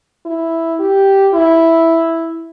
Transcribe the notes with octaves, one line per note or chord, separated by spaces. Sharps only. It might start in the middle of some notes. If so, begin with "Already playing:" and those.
E4
G4
E4